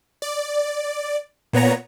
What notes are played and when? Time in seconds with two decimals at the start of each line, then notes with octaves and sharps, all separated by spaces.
0.22 D5
1.53 A#2 B3 C#5 A#5